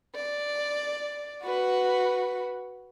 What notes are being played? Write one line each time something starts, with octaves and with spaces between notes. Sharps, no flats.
D5
F#4 B4